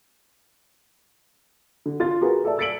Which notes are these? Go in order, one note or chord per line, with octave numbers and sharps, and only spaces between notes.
D3
F4 A6
F#4 G#4 A#4 B4
A4 D5 E5 A5
E6 A6 B6 C#7 D7 F#7